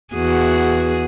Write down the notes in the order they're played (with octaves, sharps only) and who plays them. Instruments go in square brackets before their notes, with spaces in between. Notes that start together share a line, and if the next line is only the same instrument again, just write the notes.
[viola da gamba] E2 F#4 G#4